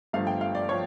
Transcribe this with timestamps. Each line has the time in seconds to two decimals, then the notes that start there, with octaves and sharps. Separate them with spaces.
0.13 G1 G2 F3 A3 F5
0.27 G5
0.41 F5
0.55 D5
0.69 F3 C#5